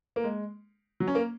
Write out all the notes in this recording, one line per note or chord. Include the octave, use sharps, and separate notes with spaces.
A#3
G#3
F#3
C#4
A#3